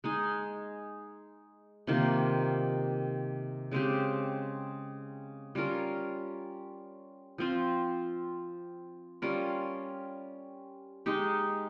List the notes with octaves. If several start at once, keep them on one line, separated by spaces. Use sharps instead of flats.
G#3 D#4 G#4
C3 D#3 A#3 F4
C#3 G#3 C4 G4
G3 C#4 F4 A#4
F3 C4 F4
G3 C#4 F4 A#4
G#3 D#4 G4